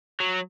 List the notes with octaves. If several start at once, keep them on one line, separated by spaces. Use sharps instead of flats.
F#3